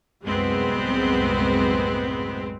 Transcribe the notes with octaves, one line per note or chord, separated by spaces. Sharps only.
C2 F#2 A2 G#3 B3 C4